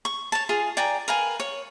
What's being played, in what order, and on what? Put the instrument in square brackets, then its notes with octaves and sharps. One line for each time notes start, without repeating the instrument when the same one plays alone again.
[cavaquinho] C#6
C#5 A5
F4 G#4 F5
D5 G5 G#5 A#5
A#4 B4 F5 G#5
C#5